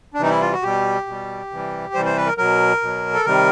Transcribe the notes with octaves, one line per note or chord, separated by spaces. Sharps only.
D4
C3 E3 G3 D#4
E4
F4
F#4
B2 G3 G4
B2 G3
C3 E3 G3
C3 E3 G3 C5
C5
B4
A#4
B2 F#3 A#4
B2 F#3
A4
C3 D#3 G3 A#4